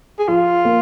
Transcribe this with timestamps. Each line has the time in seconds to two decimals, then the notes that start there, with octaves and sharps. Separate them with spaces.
0.19 G#4
0.28 F3 F4
0.65 A#3